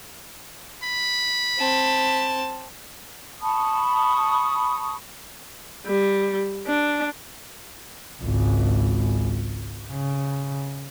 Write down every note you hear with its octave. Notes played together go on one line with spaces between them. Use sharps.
B5
C4 A5
A5 B5 C#6 D#6
G3
D4
G#1 C#2
C#3